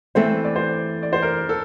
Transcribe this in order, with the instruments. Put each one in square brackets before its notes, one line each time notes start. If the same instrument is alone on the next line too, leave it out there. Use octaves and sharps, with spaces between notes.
[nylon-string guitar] E3 A3 C4 [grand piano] C5
[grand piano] D5
C5
D5
C5
A#4
A4